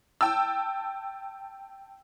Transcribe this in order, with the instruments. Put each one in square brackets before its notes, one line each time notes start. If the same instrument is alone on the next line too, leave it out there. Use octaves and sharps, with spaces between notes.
[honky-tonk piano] G5 A5 E6